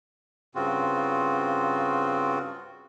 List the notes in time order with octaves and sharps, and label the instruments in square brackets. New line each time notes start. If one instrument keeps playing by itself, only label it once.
[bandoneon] G2 C#3 C4 F4 F#4